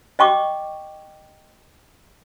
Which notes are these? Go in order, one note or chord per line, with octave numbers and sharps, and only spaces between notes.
D#5 G5 C#6 D6